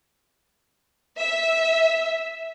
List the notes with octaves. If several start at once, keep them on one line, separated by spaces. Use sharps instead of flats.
E5